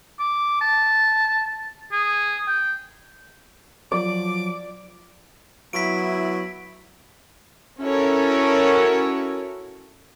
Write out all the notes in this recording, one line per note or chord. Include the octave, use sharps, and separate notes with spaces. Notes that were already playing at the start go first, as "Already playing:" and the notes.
D6
A5
G#4
G5
F3 F#3 D5 D6
F#3 B3 E4 B6 D7
C#4 E4 F#4 A4 A#4 C#5